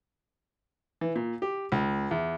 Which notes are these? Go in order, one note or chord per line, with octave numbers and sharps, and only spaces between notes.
E3
A#2
G4
C#2
E2